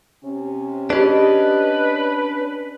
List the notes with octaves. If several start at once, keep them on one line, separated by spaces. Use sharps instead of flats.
C3 C#4
C#4 D4 G4 G#4 B4 D5 D#5